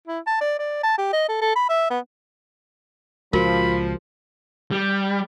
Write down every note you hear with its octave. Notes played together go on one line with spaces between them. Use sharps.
E4
A5
D5
D5
A5
G4
D#5
A4
A4
B5
E5
B3
C#2 A#2 F3 F#4 A#4 B5
G3